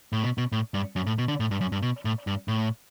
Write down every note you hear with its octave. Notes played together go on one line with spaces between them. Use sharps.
A2
B2
B2
A2
G2
F#2
A2
B2
D3
A2
G2
F#2
G2
B2
A2
G2
A2